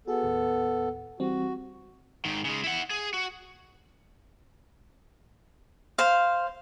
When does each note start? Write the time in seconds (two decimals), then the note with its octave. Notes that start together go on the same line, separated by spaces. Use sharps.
0.07 B3 F#4 G#4 A4
0.23 D#2 A2
1.20 E3 G3 C4 F#4
2.25 G#2 D#3
2.45 C#3 G#3
2.64 E4 F#5
2.90 G#4
3.14 F#4
5.98 C5 F5